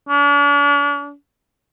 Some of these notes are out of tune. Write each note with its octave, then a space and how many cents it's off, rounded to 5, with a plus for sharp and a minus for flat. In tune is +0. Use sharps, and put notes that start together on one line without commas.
D4 -45